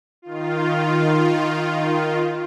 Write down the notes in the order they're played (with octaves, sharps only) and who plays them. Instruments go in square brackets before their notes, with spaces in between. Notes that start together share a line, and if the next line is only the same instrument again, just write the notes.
[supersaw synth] D#3 F4